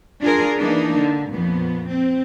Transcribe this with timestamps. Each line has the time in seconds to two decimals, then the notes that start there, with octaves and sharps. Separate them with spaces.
0.22 D4 F4 G#4 A#4
0.59 E3 A#3 D4 D#4
1.00 D3
1.31 F2 A#2 B3
1.88 C4